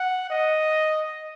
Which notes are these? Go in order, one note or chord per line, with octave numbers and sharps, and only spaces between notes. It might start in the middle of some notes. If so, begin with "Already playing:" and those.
Already playing: F#5
D#5